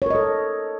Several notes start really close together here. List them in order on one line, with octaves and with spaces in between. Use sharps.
C#5 A#4 D#5 A4